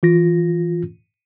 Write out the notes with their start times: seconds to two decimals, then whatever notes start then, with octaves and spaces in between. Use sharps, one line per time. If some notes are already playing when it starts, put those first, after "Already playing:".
0.03 E3 F4 A#6